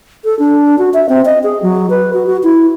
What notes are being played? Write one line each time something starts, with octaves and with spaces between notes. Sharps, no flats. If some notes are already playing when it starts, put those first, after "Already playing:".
A4
D4
F#4
E5
C4
D#5
G#4
F#3
B4
F#4
F#4
E4